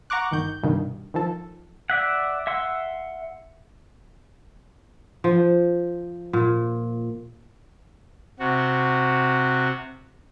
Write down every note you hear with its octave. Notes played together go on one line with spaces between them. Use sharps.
F#5 A#5 C#6 D6 F#6
G1 D#3 G6
C2 G2 B2 D#3
D#3 F3 A4
D5 E5 F#5
E5 F#5 C6 E6
F3
A#2
C3 F#4